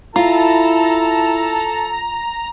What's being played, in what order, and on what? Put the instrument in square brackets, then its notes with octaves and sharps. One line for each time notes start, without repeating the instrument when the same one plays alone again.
[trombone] E4 [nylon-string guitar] F4 [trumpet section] A4 A5 [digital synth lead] A#5